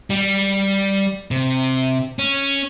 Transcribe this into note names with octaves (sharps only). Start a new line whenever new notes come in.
G3
C3
C#4